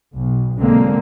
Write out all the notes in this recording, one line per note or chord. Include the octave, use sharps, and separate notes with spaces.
B1
B1 D3 G#3 A#3 C4